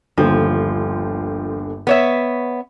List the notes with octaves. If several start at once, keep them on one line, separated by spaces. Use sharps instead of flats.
G1 D#2 D3 F3
B3 C#5 E5